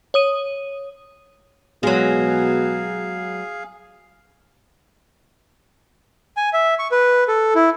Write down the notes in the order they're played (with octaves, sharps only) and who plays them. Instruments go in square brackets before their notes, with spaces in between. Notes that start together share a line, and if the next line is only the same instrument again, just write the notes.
[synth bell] C#5 D#6 D#7
[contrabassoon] B2 [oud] F#3 G#3 [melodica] G#4 F5
[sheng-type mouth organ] G#5
E5
C#6
B4
A4
E4